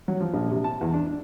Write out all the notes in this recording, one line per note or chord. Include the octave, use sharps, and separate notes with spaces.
F#3
F3
A#1
C3
A5
E2
D4
D4